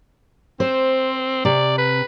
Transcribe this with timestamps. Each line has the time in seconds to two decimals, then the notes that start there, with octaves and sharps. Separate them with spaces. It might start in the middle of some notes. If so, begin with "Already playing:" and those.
0.60 C4 C5
1.45 C3 D5
1.78 B4